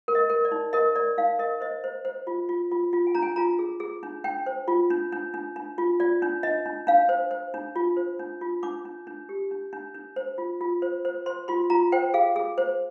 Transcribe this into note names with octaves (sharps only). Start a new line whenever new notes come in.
A#4
D#5
A#4
D5
D#4
A#4 D#5
A#4 D5
D#4 F5
A#4 D#5
C5 D#5
C5
C5
F4
F4
F4
F4
G#5
D4 A#5
G#5
F4 A#5
G#4
G#4
D4
D4 G5
C5
F4
D4
D4
D4
D4
F4
F4 D5
D4
D4 D#5
D4
D4 F5
C5
C5
D4
F4
C5
D4
F4
D4 D6
D4
D4
G4
D4
D4
D4
C5
F4
F4
C5
C5
C5 C6
F4 C6
F4 A#5
C5 G5
G#4 F5
G#4
C5